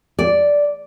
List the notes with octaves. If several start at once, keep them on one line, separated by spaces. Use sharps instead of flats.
D5